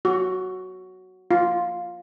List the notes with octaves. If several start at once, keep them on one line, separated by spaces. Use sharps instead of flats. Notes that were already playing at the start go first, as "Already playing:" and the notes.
F#4
F4